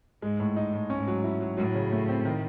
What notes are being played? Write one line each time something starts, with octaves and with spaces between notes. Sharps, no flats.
G#2 G#3
A2
D#4
A2
G#2 C#4
F#3
E4
F#3
A2 F#3
C#3
A3
C4
D#3